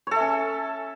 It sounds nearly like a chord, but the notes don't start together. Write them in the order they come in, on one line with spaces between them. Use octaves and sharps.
C#5 A4 E5 C#4